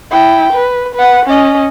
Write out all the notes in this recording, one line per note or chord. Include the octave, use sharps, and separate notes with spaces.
E4 G5
B4
B4 F#5
C#4 D#5